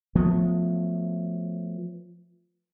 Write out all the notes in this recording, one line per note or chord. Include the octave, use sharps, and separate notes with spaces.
F3 F#3 A3 B3